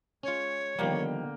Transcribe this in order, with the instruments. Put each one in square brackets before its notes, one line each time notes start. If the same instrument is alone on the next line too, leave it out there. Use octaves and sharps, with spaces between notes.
[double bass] G#3 [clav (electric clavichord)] C#4 F4 [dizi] C#5
[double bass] D3 B3 [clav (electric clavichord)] D#3 F3 G3 [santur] A#3 G5